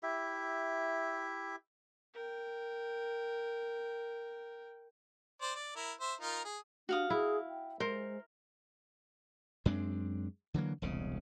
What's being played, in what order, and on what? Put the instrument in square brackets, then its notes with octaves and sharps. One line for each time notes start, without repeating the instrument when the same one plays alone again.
[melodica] E4 G4 E5
[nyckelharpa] A#4 G5
[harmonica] C5 D5
D5
E4 A#4
C5 E5
D#4 F4 A#4
G#4
[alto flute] D4 [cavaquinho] F#4 F5 D#6
[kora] E4 [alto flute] G#4
[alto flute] G5
[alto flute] G#3 [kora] A#4 [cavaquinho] C5
[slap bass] F#2 G#3 C4 D4
D3 E3 F#3 A#3
E1 C2 C#3